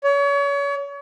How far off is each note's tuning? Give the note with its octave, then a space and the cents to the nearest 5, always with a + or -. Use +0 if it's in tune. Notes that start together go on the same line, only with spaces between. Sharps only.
C#5 +35